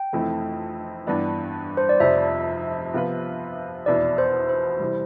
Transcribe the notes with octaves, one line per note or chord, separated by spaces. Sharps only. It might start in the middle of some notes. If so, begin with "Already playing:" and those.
Already playing: G5
F1 F2 E3 A3 C4
G2 E3 B3 D4
C5
D5
F1 F2 C3 F3 E5
C3 F3 B3 F4 B4
F1 E2 B2 B3 E4 D5
C5
C5
C3 E3 G3